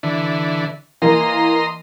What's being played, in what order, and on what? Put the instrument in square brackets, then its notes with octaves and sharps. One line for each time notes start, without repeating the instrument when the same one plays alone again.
[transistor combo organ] D3 E3
[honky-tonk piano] E3 A#3 [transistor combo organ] D#5 A#5 C6